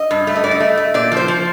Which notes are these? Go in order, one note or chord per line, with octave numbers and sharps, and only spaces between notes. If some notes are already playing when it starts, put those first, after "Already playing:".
Already playing: D#5
G2
A3
D#5
G2 D5
D#5
A3
A3
A#2 D5
F3 C5
F3